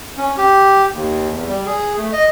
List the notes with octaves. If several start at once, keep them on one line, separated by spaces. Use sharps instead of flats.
C#4
G4
D#2
E2
G3
G#4
A3
D#5